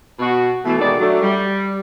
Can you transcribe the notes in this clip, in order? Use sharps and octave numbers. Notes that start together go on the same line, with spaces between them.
B2 F#4
B2 E3 A3
B2 D#3 G#3 A3 D#4 D5
F#3 A3 D4
G3